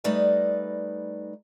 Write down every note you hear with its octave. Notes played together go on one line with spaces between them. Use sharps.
G3 A3 D#4 B4 D5 D#5